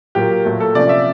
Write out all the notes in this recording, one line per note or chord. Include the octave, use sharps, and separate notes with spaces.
A#2 F#3 A#3 G4
A#2 F#3 A3
A4
C3 F3 A3 C#4 D5
E5